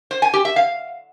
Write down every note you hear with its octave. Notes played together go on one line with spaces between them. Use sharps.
C5
G#5
G4
E5
F5